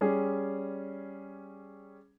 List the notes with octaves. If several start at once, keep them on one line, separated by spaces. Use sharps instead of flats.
G3 C#4 G#4